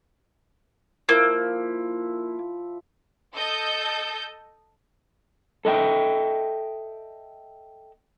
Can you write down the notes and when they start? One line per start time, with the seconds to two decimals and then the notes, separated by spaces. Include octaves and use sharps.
1.09 F3 A#3 E4 E6
3.35 A4 D#5 G6
5.65 A4 D#5 E5 G5